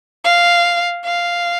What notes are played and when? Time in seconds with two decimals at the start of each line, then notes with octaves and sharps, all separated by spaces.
0.25 F5
1.06 F5